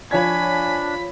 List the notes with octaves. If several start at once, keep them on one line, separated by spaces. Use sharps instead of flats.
F3 D4 C#5 G#5 B5 G#6 B6